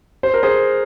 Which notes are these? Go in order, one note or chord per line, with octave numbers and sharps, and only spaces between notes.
C5
A#4
G#4 C5